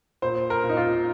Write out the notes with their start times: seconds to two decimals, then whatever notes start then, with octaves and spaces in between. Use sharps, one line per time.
0.22 A#2 C5
0.50 A#4
0.64 A#2
0.69 D#4
0.77 F4